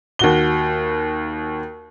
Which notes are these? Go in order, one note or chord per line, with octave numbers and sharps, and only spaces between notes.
D#2 F#4 G7